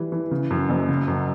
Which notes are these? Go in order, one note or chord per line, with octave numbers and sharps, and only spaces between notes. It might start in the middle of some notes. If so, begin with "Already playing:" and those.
Already playing: E3 G3
E3
C#3
F#2
F#1
C#3
F#2